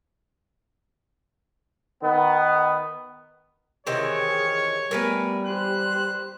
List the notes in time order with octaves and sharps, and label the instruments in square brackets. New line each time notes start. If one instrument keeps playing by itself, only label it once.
[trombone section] D#3 B3
[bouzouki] C3 D#3 E3 [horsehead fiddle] G#4 [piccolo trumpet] C#5
[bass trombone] G3 [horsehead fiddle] A3 B3 [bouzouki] A#4 B4 G#5
[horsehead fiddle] G4 C5 [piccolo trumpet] F#6